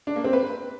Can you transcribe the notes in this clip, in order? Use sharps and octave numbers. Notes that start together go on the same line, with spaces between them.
D4
A#3
C4
B4